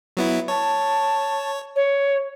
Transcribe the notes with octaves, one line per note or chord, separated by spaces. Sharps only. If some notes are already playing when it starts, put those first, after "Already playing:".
F#3 B3 E4
C#5 A5
C#5